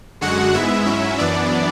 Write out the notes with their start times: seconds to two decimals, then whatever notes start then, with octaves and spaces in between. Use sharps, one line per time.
0.21 F#2 D3 G#3 F#4 F#5
0.54 G#2 G#3 B3 E4 E5
0.86 G#2 F#3 C#4 E4
1.18 F#2 E3 B3 D4 D5